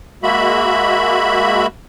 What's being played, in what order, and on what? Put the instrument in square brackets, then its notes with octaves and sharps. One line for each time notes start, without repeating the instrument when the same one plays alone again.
[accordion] G#3 A#3 F#4 E5 B5